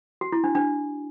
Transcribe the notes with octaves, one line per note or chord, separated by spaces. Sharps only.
F#4
E4
D4
D4